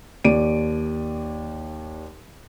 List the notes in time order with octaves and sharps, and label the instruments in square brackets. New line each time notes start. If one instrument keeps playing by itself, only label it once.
[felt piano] D#2 D5 D7 D#7